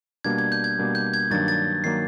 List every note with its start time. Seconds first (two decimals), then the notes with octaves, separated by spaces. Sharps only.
0.24 B2 G3 A#3 D4 G#6
0.38 G#6
0.52 G6
0.64 G#6
0.79 B2 G3 A#3 D4
0.95 G6
1.14 G#6
1.30 G2 D#3 F#3 A#3 D4 A6
1.48 A6
1.84 D#3 F#3 A#3 D4 C7